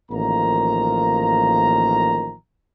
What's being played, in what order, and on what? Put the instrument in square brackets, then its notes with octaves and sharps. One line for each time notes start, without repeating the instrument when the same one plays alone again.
[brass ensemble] A1 D#3 F3 A#3 A#5